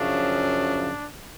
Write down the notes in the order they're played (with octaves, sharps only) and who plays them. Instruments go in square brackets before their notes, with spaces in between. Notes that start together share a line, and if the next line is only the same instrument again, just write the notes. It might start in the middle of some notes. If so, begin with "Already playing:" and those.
Already playing: [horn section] F#2 C#3 F3 D4